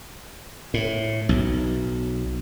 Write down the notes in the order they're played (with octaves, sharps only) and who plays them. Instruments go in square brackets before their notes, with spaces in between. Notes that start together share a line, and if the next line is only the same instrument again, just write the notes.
[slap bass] A2
B1